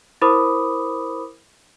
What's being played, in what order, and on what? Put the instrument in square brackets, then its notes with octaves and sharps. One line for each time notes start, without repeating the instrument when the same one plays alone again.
[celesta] E4 A#4 C5 B5 D6 D#6